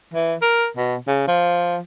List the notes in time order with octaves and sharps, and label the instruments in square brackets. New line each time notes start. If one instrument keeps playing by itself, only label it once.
[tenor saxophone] E3
A#4
B2
C#3
F3